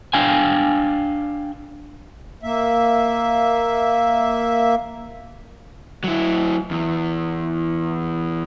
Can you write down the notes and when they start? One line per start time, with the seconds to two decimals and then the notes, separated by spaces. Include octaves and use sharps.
0.13 D4 F5 G5 G#5
2.42 A#3 E5
6.04 F#3 E4
6.71 E2